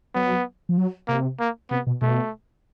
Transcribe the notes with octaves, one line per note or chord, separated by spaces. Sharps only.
F#3 B3
F3
F#3
C3 A#3
A#3
C3 B3
B2
B2 A3